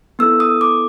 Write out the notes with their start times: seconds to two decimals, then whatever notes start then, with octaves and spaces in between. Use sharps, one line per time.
0.19 B3 E4 A4 E6
0.40 D#6
0.61 D6